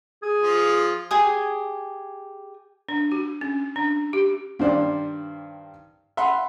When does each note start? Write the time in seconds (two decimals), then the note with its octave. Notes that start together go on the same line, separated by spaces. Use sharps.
0.22 G#4
0.41 F3 F4
1.11 G4 G#4 G#5 D#6
2.89 D4
3.12 F#4
3.41 C#4
3.76 D4
4.13 G4
4.59 G2 D#3 C5 D5
6.17 E5 F#5 B5 C6